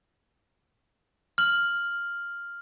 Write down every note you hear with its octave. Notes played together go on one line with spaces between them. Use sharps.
F6 F#7